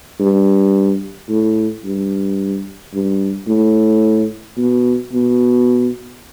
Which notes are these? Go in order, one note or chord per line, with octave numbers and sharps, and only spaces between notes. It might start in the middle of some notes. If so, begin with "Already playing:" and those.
G2
A2
G2
G2
A2
B2
B2